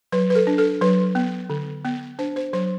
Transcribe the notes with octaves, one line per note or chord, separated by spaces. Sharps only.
F#3 B4
B4
A4
D4
A4
F#3 B4
B3
D3
B3
D4 C5
C5
F#3 C5